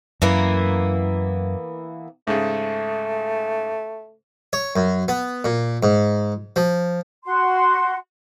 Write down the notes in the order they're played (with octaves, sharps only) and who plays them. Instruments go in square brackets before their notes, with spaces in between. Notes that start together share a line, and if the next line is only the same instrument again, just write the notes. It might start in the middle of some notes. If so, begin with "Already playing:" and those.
[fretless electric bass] F#2 [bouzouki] E3 A#3 B3
[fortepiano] G#2 C#3 [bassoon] A3
[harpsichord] C#5
F#2
B3
A#2
G#2
F3
[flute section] F#4 C6